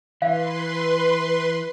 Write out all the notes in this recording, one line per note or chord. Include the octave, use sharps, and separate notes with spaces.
E3 B4 F5 C6